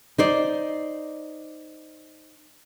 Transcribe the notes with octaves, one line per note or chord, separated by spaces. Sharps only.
D#4 C5 D5